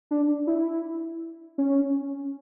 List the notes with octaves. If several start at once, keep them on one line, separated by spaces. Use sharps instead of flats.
D4
E4
C#4